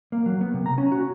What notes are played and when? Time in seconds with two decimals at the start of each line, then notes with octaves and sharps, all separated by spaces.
0.12 A#3
0.26 F#3
0.41 B3
0.54 C3
0.66 A#5
0.78 C#4
0.92 F#4